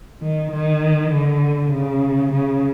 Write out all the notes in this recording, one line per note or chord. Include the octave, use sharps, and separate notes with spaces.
D#3
D#3
D3
C#3
C#3